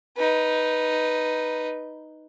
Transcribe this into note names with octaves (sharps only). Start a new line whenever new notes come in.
D#4 B4